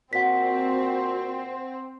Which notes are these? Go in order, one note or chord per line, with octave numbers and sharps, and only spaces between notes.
A#2 C4 F#4 F#5 B6